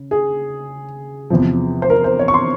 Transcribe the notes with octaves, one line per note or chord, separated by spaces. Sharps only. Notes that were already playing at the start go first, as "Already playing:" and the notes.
Already playing: C#3
G#4
E2 C3 F3
C5
A#4
C5
C#5
C#6
C6